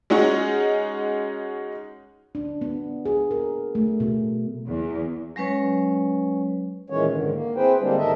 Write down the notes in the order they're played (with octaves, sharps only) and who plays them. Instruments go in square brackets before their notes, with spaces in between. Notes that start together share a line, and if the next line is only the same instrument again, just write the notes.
[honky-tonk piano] G#3 C#4 D#4 F#4
[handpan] D4
B3
G#4
A#4
A3
B2
[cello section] E2
[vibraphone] F#3 G#3 C#4 B4 C#5
[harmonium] A#2 D#3 E3 G#3 C#4 C#5
G#2 D3 D#3
A#3
C4 E4 G#4 B4 C5 G5
D3 G3 G#3 A#3 C4 D4
G#2 D#3 A4 A#4 D#5 E5